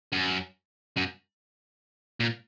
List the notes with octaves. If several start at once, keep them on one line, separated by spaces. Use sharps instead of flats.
F#2
F#2
A#2